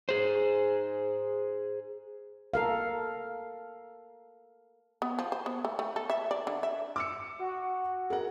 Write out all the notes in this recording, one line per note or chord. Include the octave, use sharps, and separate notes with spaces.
G#4 C5
A4 A#4 F5
B3
F3
C5
B3
A3
A3
A4
E5
D5
D3
E5
D6 E6 C#7
F#4
G#4 A#4 F#5